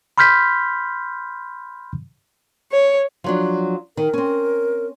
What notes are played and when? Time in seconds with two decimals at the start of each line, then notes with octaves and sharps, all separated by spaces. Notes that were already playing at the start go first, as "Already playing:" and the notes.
0.18 B5 C6 F6 G6 B6
2.72 C#5
3.24 F3 F#3 D4
3.97 D#3 A#4
4.13 C4 C#4